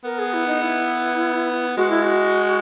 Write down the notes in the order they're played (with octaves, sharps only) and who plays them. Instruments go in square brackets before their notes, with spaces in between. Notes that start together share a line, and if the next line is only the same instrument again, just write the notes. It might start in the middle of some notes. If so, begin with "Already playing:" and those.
[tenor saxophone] B3 [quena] A#4
[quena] G#4
E4
D#4
E4
[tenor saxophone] G#3 [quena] F#4
[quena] E4
F#4